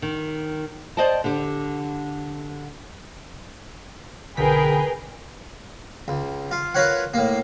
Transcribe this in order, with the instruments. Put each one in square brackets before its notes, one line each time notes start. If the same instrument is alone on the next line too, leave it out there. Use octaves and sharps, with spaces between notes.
[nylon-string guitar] D#3
C5 D5 D#5 G5 A5
D3 G4
[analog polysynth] B1 D3 B6 [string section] G#4 B4 G5 [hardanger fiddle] A#4
[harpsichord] C#2
F4
F4 A#4 B4 C#5 F#5
A2 A#3